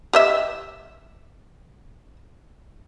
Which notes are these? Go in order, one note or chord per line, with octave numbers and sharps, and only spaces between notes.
G4 D#5 E5